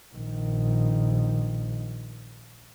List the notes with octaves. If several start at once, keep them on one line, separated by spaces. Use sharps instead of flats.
A#1 D#3